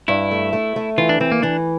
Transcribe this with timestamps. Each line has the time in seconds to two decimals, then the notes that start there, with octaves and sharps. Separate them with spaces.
0.08 G2 E4
0.31 A3
0.53 A3
0.76 A3
0.98 E3 F4
1.09 D4
1.20 E3 C4
1.32 A#3
1.42 E3 D4